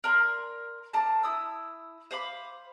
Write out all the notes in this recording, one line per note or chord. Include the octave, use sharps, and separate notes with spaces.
A#4 D5 A#5 C6
D4 A#4 A5 A#5
E4 D#6 E6
C5 F5 B5 D6